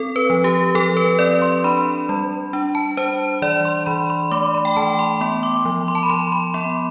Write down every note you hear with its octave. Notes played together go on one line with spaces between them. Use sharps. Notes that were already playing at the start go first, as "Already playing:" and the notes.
Already playing: C4 A4
B4
F3
G4
F3 A4
B4
C4 D5
C6
D4 B5
G3
D4
A5
D4 C5
E3 D5
C6
E3 B5
C6
A3 D6
B5
G5
E3 A5
C6
B3 C6
D6
F3
C6
A5
B5
F3 C6
B5
B3 C6